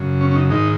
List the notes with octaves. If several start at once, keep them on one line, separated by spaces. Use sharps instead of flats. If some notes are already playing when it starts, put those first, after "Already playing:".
Already playing: F#2 C#3
C#4
C#4
D#4
G#2 D#3 D#4